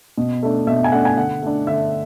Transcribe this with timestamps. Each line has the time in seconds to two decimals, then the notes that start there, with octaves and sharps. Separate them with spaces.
0.18 B2
0.43 A3 D4
0.67 B2 E5
0.84 G#5
0.92 A3 D4 F#5
1.05 G#5
1.17 D3 F#5
1.42 A3 D4
1.67 D3 E5